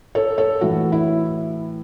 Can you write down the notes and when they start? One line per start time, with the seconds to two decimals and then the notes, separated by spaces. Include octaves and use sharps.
0.15 A4 C#5
0.38 A4 C#5
0.61 A2 E3 F#4
0.92 E4